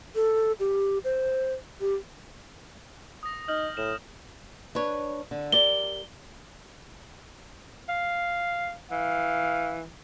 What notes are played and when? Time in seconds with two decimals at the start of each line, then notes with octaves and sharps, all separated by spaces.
0.15 A4
0.60 G4
1.04 C5
1.81 G4
3.23 D#6 A#6
3.48 D#4 F6 G6 F#7
3.77 A2 E7
4.75 D4 B4 C#5
5.31 D3
5.52 G4 A#4 D5 G7
7.89 F5
8.91 E3 F5